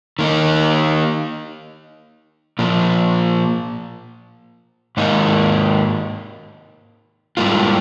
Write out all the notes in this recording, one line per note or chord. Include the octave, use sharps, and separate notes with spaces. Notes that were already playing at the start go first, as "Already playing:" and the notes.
D#3 A#3 D#4
A#2 F3 A#3
G#2 D#3 A#3 D#4
G#2 G3 A#3 F4